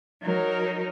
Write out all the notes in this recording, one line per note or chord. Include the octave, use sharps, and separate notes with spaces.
F#3 D#4 A#4